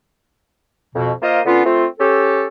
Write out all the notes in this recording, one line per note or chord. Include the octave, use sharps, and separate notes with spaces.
F2 B2
A#3 F4 A#4 C5 D#5
D3 B3 C#4 F4
A3 C4 F4
C#4 G4 A4